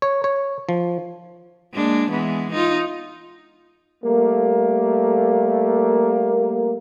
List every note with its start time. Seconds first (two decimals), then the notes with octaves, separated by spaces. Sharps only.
0.02 C#5
0.24 C#5
0.69 F3
1.73 G#3 A#3 D4
2.10 E3 G#3 B3
2.52 D#4 F4
4.05 G3 A3 A#3